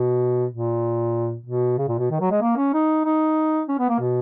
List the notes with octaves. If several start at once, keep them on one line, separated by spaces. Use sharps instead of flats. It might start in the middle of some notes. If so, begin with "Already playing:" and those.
Already playing: B2
A#2
B2
C#3
A#2
B2
D#3
F#3
G#3
A#3
C#4
D#4
D#4
C#4
B3
A#3
B2